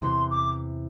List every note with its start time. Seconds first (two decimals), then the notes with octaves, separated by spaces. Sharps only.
0.02 E2 C3 E3 C6
0.30 D6